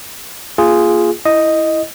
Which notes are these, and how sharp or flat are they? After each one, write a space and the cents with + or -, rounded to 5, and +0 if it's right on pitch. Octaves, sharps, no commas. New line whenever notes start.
A#3 +0 F4 -10 G#4 +0
E4 +0 D#5 +0